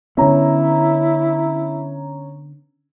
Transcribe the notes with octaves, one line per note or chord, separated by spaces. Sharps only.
D3 B3 C#4 E4 A#5